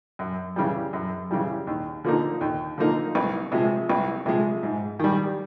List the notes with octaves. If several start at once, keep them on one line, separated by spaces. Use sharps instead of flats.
F#2
C#3 E3 G3
F#2
C#3 E3 G3
D#2
D3 F3 A#3 D#4
D#2
D3 F3 A#3 D#4
C2
C3 F3 G#3
C2
C3 F3 G#3
G#2
D#3 G3